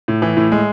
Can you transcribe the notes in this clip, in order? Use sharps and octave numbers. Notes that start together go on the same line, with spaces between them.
A2
E3
A2
G#3